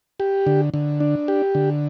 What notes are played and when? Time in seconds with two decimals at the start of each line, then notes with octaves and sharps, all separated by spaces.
0.20 G4
0.47 D3
0.74 D3
1.00 D4
1.28 G4
1.55 D3